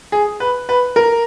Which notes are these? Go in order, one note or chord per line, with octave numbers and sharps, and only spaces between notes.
G#4
B4
B4
A#4